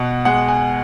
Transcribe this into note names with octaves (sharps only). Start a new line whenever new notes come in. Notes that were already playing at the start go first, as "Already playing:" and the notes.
Already playing: B2 F#5
G#3 F#5
G#5